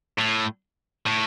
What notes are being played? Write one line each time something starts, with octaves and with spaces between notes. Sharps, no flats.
A2
A2